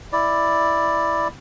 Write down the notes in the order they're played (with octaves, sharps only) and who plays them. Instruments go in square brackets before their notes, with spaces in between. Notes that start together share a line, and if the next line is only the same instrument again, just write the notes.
[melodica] E4 D5